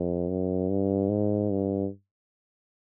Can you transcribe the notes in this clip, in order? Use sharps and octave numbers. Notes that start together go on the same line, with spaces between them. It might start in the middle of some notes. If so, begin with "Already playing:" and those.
Already playing: F2
F#2
G2
G#2
G2